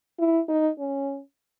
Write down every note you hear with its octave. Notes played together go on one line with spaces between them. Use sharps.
E4
D#4
C#4